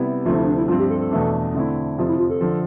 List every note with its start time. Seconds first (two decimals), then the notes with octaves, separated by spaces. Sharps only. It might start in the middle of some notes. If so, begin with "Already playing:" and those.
Already playing: C3 G3 B3 E4
0.25 D2 C3 F3 A3 F4
0.36 E4
0.47 D4
0.57 E4
0.68 G2 F3 C4 F4
0.79 G4
0.90 A4
1.01 A4
1.11 E2 B2 A3 D4
1.55 D3 A3 C4 E4
1.98 F2 C3 F3 F4
2.09 E4
2.19 F4
2.30 A4
2.41 D3 F3